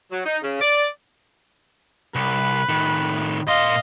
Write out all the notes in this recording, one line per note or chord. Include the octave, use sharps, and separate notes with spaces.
F#3
D#4
C#3
D5
C2 B4
A2 D#3
A#2 D#5 F5 C6